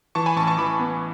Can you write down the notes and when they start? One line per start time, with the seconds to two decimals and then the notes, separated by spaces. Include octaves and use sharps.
0.15 E3 A5 C#6
0.26 G#5 B5
0.36 A1 A5 C#6
0.47 A5 C#6
0.58 E3 B5 D6
0.79 B3